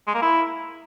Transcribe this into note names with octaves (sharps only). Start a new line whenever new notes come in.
G#3
A#3
E4